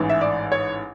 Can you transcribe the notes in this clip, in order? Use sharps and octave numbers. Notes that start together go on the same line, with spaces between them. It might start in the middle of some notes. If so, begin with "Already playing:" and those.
Already playing: A1 G#2 E3
E5
D5
C#5